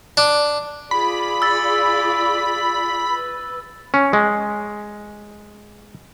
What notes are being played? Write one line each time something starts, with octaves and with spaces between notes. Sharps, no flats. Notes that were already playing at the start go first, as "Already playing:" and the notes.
D4
F4 G#4 D5 B5
E6 A6
B4
C#4
G#3